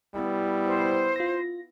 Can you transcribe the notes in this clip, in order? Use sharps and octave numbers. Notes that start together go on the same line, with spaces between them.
G3 B3 E4
C5
F4 A#6